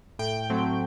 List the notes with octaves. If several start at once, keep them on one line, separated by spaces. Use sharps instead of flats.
A2 G5
F#3 A3 C4